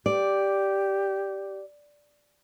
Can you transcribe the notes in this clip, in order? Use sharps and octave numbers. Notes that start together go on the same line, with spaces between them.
G4 D5